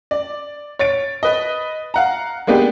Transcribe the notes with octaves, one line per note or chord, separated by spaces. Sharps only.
D5
C#5 A6 D7
B4 D#5
F5 F#5 A#5
G#3 A#3 B3 D4 G4